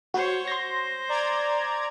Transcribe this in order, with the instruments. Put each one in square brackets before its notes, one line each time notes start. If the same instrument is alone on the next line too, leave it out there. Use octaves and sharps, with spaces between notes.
[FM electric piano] F#4 [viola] C5 C#5
[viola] C5 [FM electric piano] C6 A#6
[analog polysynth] D5 A#5 G#6